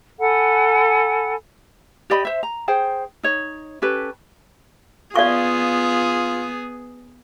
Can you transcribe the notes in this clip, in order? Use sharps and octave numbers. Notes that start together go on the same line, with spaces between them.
A4 F#5 G#5 B5
G4 D5 D#5 B5
C5 E5
A#5
G#4 C5 G5
D#4 C#5
C#4 G4 A4 B4
B3 F4 G#4 D5 F5 C#6